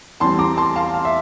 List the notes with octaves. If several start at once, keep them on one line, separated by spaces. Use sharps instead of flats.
E2 E3 G3 C4 A5 C6
A#5 D6
A5 C6
F5 A5
F5
E5